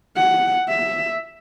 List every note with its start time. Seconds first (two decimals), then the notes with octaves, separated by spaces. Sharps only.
0.17 F#5
0.69 E5